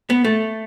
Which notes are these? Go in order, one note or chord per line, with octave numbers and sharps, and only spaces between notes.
B3
A3